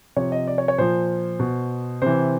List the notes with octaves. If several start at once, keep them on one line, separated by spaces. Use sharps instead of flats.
C3 F3 C#5
D#5
D5
C#5
C#5
A#2 F3 C5
B2
C3 E3 C5